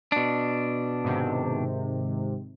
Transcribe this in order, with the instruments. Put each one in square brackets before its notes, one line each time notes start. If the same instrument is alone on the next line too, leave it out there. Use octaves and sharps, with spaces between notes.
[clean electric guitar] B2 D4
[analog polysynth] G#2 C3 D#3